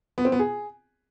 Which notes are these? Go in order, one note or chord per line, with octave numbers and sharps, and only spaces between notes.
B3
C4
B3
G#4